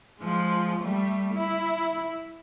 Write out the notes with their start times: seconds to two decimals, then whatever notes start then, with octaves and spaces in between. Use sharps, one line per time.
0.20 F3 G#3
0.82 G3 A3
1.34 E4